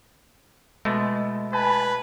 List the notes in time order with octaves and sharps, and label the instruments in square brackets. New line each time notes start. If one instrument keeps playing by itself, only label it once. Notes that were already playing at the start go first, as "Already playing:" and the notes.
[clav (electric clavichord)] B2 A3 [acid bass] G#3
[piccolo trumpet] B4 [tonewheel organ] G#5 A5 B5